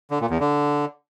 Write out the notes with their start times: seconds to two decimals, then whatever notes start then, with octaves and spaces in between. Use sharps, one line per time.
0.11 D3
0.20 A#2
0.30 E2
0.40 D3